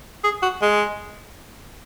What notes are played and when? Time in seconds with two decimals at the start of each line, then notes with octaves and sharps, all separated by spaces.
0.24 G#4
0.42 F#4
0.62 G#3